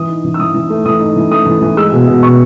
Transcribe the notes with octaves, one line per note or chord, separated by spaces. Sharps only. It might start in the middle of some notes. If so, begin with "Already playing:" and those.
Already playing: E3 D#6
D#4
E3
E6
E3 D#6
E3
A3
E3 D#6
D#4
E3
A3 D#6
E3
E3
G#3 E6
B2
B2
B2 C#6